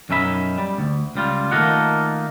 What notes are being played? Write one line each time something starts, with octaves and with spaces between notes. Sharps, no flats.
B1 F#2 C#4 D#4 E5 B5
G3
D2
C#2 G3 F4
D#3 A3 A#3 D#4 F4 F#5